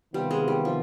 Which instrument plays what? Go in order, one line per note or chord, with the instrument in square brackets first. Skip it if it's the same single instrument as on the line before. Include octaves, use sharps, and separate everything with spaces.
[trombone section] C3 D#3 B3 F4 [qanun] G3
[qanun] G#3
G3
F3